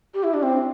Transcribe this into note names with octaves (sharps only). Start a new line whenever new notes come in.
G4
E4
D4
C4